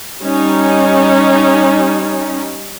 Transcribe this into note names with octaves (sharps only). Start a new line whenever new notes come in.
G3 C#4 D#4